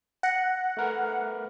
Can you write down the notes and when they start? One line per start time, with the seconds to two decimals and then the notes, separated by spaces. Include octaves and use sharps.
0.23 F#5 F#6 A#6 C#7
0.77 A3 A#4 B4